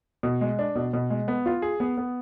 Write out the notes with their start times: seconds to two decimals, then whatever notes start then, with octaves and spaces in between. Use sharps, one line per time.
0.23 B2
0.41 G#3
0.59 D4
0.75 B2
0.93 B2
1.10 G#3
1.28 B3
1.46 F4
1.62 G#4
1.80 B3
1.97 B3